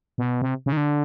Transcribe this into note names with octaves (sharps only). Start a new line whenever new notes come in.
B2
C3
C#3
D#3
D3